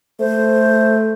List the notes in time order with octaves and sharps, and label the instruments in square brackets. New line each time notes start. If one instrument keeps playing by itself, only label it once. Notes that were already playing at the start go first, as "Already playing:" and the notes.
[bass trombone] A3 [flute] C5